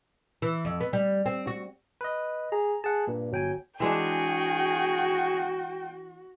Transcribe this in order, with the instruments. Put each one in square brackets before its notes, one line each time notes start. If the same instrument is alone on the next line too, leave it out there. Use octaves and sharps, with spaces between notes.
[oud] E3
F2
B3
G3
C4
F#4
[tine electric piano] B4 D#5
[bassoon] G#4 [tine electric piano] A#5
[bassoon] G#4 [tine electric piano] F#5 A5
[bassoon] G2 [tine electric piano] A#2
[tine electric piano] G1 G5 G#5 [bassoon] F#3
[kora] E3 G#3 D4 [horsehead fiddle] F#4 [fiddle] G#4 C#6 [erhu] G5